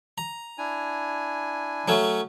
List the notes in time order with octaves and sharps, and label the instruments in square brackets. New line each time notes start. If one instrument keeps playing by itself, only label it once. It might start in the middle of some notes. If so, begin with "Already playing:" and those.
[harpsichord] A#5
[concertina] D4 E4 G#5
[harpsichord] F#3 A3 C#4